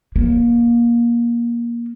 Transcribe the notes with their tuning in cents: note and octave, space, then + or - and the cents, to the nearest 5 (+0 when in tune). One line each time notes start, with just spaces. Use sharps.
A#3 +20